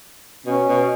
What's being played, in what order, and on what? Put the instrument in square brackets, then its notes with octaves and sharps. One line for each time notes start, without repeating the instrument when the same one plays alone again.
[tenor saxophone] B2 [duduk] C#4
[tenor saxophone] B2